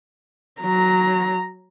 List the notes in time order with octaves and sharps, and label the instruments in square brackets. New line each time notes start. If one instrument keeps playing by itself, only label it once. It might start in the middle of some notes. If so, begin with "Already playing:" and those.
[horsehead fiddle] F#3 A#5